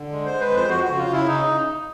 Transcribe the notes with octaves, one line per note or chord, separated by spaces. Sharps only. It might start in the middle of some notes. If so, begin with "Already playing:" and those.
Already playing: D3
G#3
C5
G#3
B4
F2 C5
F2 F#4
C#3 F#4
F4
C#3
E4
C#3 D#4